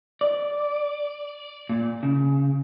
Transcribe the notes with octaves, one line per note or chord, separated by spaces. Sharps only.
D5
A#2
C#3